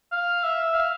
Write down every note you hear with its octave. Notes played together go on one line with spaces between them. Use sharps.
F5
E5
F5